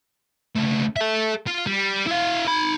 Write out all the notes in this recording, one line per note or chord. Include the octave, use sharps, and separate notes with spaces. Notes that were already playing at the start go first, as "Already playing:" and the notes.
C#2 A3
A4 E5
F4
G3
E4 F5
D#4 B5